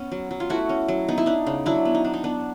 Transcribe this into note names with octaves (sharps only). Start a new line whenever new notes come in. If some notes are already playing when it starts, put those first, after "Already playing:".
Already playing: B3 C#4
F#3
F#3
F4
A3 E4 F#4
C#4
F#3
B3 D#4
E4
D4 D#4
C#3
F#3 D4 E4
B3
D#4
D4
D#4
B3 D4